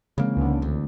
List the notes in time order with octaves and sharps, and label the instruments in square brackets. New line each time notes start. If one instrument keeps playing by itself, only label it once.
[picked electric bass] C#3 A#3 [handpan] E3 G#3 C4
[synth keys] C#2 D3
[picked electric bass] D2